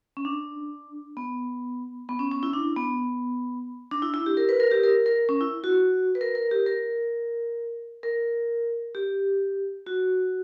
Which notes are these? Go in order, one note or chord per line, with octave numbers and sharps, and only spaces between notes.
C#4
D4
B3
B3
C#4
C#4
E4
D4
B3
D4
E4
E4
G4
A#4
B4
A#4
G4
A#4
A#4
C#4
E4
F#4
B4
A#4
A#4
G4
A#4
A#4
G4
F#4